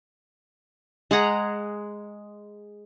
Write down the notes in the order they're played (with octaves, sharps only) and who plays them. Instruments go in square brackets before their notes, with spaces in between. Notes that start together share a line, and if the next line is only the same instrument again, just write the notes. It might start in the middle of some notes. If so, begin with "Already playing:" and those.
[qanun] G#3 G#4 F#5 A#5